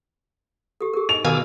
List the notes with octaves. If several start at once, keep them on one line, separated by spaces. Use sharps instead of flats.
G4 A4
G4 G#4 A#4
D#4 D#5 F7
B2 D#3 F5 G#5 D6 E6